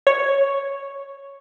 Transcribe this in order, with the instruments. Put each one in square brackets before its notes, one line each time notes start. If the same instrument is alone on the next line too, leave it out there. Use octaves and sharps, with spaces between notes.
[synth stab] C#5